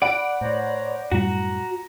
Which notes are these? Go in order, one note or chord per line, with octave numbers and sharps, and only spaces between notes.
D5 F#5 B5 D7
A2 C5 C#5 A#5
F#2 A2 G3 F#4 A#5